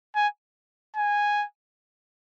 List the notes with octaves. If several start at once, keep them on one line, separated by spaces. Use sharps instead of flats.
G#5
G#5